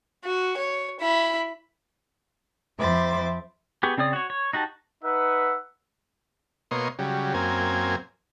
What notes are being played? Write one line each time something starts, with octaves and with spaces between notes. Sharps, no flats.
F#4
C#5
E4 B5
F2 C5 E5 B5 D6 A6
B3 G4 G#4 C#6
C#3 C4 C#5 D5 D#6
F#4 C#5
C#5
D#4 F#4 G4 A5
D#4 B4 E5 F#5
B2 A#3 C#5 D#5 C6
C#3 F#3 G3
F#2 A#3 C4 G#5